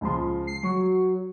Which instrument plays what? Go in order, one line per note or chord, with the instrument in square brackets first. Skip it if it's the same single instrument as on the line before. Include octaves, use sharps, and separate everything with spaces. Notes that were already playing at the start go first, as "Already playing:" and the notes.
[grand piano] C#2 F3 C6
[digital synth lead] C7
[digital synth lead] F#3 [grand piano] C#6